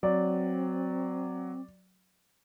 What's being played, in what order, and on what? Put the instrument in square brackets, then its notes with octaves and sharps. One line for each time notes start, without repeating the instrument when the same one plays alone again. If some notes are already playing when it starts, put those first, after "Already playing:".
[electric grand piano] F#3 [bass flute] C4 [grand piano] D5